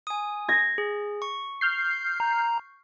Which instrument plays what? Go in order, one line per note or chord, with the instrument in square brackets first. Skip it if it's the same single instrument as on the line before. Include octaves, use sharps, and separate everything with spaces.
[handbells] G#5 D#6
[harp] G#6 A#6
[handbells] G#4
C#6
[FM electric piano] F6 G6 C7
[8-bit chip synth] A#5